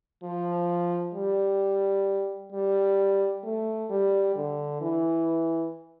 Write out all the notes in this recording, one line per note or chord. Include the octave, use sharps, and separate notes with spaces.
F3
G3
G3
A3
G3
D3
E3